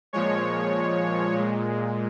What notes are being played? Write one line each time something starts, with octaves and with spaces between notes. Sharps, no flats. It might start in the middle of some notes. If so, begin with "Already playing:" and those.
A#2 F3 G#3 C#5
A#2 G#3